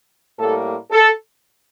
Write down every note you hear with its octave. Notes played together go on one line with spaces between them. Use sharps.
A2 G3 A#3 A4
A4